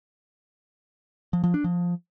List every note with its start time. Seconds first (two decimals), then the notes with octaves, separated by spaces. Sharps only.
1.33 F3
1.44 F3
1.54 D4
1.64 F3